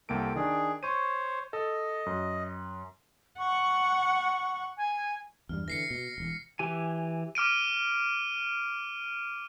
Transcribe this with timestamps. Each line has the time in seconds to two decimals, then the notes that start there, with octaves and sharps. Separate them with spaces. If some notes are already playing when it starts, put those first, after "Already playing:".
0.09 C2 A#3 G4 A4 D7
0.35 D#3 D4 G#4
0.83 C5 C#5 C#6 D#7
1.53 A4 D#5
2.06 F#2
3.39 F#5 C#6
4.77 G#5
5.49 E2 G2 G3 F6
5.68 D3 E3 A#6 C7 C#7
5.91 B2
6.18 E1 E2
6.59 E3 G4 G#5
7.35 D6 F6 D7 D#7